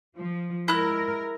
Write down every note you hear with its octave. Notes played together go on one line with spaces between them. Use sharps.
F3
G#3 E4 A#4 F#6